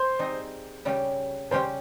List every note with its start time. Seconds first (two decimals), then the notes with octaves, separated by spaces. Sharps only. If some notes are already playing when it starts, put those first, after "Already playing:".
Already playing: C5
0.19 G3 C4 D#4 G#4
0.85 C#3 G3 C#4 G4
1.51 C#3 G3 C#4 G4 C5